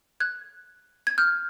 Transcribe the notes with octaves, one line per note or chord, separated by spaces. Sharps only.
F#6 G#6
G#6
F6 G6